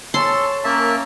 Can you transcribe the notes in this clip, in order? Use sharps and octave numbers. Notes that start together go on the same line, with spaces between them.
A4 C#5 G#5 A5 C6 C#6
A#3 C#4 A#4 E5 A5